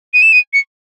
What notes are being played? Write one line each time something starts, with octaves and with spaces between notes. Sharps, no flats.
D#7
E7
D#7
C#7